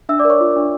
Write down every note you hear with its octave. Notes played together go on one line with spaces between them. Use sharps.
D4 E5 E6
D5 D6
A#4
C#5 C#6
F4
D4